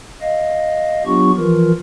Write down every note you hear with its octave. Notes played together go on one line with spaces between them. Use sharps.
D#5 F5
F#3 B3 D4 F4 G4 C#6
E3 F3 F4 A#4